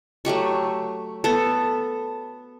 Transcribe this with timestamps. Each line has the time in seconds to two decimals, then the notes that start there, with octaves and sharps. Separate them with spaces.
0.25 F#3 A3 G4 C#6
1.24 B3 A4